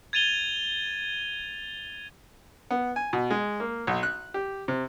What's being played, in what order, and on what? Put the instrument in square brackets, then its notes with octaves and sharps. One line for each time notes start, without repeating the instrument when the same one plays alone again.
[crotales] G#6 A6 D#7 F7 G7
[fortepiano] B3
G#5
B2
G#3
A#3
B1
F#6
G4
C3